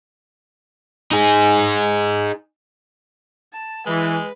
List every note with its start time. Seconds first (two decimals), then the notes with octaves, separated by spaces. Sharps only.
1.11 D#4 G#4
3.53 A5
3.87 E3 G#3 B4